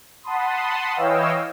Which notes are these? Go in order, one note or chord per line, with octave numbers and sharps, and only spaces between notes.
F#5 A5 B5 C6 D#6
E3 C#5 D#5 F5 G5 E6